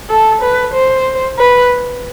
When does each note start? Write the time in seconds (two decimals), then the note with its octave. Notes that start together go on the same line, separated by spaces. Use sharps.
0.09 A4
0.42 B4
0.74 C5
1.39 B4